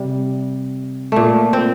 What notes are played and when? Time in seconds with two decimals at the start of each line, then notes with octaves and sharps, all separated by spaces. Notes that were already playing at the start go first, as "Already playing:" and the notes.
Already playing: C3 G3
1.12 A#2 A3
1.53 C4